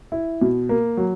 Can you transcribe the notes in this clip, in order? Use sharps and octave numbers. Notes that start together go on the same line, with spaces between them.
E4
B2
A#3
F#3